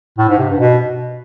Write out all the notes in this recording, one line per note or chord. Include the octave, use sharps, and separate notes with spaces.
A2
G#2
C3
G2
B2